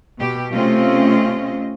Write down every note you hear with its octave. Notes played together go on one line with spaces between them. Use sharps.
B2 G4
C3 A3 C4 C#4 F4 D#5